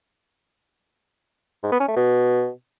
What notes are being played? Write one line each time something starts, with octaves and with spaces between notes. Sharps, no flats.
G#2
B3
C#4
A3
B2